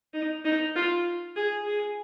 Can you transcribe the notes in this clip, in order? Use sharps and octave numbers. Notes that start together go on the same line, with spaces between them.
D#4
D#4
F4
G#4
G#4